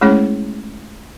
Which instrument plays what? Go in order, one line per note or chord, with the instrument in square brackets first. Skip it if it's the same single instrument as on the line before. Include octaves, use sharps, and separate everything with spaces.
[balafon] G#3 A3 C#4 E4 G#4 C#5